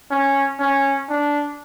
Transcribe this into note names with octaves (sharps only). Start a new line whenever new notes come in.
C#4
C#4
D4